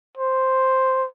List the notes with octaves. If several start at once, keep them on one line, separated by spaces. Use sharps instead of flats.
C5